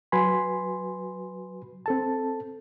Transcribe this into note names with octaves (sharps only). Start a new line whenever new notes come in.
F#3 F#4 B4 G#5 B5 C6
C4 A4 A5